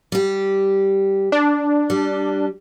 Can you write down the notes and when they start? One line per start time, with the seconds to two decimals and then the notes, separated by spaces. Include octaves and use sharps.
0.12 G3 G4
1.32 D4
1.90 G3 G4